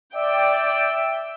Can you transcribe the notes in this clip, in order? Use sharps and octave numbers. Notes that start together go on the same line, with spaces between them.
D5 E5 G5